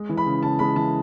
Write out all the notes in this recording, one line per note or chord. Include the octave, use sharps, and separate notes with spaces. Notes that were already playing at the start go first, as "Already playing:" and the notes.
Already playing: G#3
E3
B5
C#3
C#3 A5
G#3 B5
E3 A5